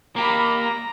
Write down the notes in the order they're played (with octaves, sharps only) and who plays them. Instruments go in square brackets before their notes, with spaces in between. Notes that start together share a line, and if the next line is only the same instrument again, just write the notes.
[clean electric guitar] A#3 G4 [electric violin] A#5 B5
[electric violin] A#5